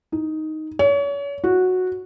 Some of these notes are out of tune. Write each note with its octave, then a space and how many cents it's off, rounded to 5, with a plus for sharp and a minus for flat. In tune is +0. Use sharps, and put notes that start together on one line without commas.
D#4 +5
C#5 +35
F#4 -10